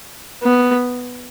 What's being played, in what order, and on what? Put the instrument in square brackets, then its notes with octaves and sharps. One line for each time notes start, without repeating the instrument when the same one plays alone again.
[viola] B3